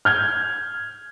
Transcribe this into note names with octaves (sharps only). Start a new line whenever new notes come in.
F6 G6 G#6